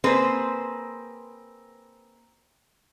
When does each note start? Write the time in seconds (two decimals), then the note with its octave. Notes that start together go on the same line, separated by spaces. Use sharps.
0.04 A#3 C4 G#4 B4 C5